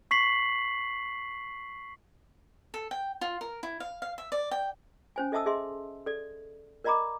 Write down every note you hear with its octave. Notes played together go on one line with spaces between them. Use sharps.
C#6 B6 C7 F#7
A4
G5
F4
A#4
E4
F5
F5
E5
D5
G5
C#4 C5 G#5
A4 D#5 E5 A5 D#6 E6
G#4 D#5 E5 C6
A4 D5
A#4 D5 D#5 A#5 B5 D6